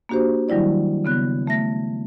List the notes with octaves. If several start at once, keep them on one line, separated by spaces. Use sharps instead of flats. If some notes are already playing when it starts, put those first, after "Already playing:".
A#3 D4 F#4 G4 C5
D#3 F#3 G3 E4 D5
C#3 B3 F#6
A3 E5 A#6